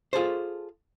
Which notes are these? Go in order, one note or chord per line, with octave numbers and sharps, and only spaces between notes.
F4 G#4 A4 C5